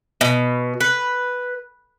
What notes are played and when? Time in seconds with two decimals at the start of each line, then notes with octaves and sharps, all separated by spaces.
0.21 B2
0.81 B4